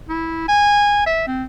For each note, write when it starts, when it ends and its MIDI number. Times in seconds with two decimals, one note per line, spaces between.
0.09 0.47 64
0.48 1.02 80
1.07 1.25 76
1.27 1.44 60